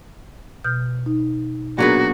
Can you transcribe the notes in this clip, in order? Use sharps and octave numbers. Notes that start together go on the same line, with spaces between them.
B2 F6 G6
D#4
A#2 F#3 B3 D4 F#4 G#4 A#4